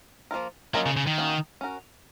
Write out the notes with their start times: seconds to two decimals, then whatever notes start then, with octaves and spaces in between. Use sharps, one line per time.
0.31 F3 A#3 F4 A#4
0.74 F#3 A#3 C#4 F4 A#4 D#5
0.86 C#3
0.97 C#3
1.07 D#3
1.18 A#3 C#4 F#4
1.61 C#4 F#4 A#4